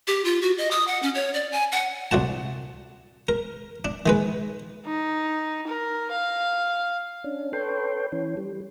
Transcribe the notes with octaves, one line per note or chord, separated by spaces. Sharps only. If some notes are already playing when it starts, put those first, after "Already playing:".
G4
F4
F#4
D#5
D#6
F#5
C#4
C#5
D5
G#5
F#5
C2 G3 F#4 A5
A#4
D4
D#3 G#3 B4
D#4
A#4
F5
C#4 D4
A4 B4 C#5 G5 C6
E3 C#4
G3